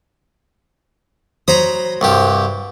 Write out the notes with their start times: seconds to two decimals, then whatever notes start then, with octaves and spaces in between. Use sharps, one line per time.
1.48 F#3 C5 A#5 B5 D#6
2.01 C2 G2 G4